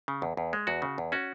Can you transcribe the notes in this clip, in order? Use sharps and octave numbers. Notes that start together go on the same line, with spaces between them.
C#3
E2
E2
G#3
E2 F#4
C#3
E2
C#4 F#4